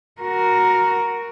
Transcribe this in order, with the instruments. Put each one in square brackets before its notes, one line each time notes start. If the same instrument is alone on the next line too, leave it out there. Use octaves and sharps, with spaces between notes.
[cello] F#4 A#4